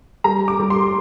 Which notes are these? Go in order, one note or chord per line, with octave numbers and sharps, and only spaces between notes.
G3 A#5
D6
G3
C6